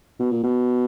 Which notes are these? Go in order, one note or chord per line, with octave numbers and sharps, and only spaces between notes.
B2
A#2
B2